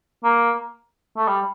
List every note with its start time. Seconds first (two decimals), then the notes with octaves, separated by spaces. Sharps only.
0.24 A#3
1.16 A3
1.28 G3